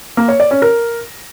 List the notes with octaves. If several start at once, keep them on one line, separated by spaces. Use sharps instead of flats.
A#3
C#5
D5
C#4
A#4